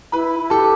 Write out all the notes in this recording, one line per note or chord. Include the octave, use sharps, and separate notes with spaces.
E4 B4 B5
E4
G4 A4 A5